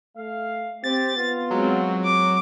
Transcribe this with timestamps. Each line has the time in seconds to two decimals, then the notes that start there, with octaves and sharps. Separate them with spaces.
0.17 A3 F5
0.84 C4 G4 A6
1.16 B3 F4
1.51 F#3 G#3 C4
2.05 D6